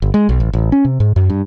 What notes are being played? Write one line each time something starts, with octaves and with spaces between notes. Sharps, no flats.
G1
G#3
B1
A1
A1
C#4
C3
G#2
F#2
G2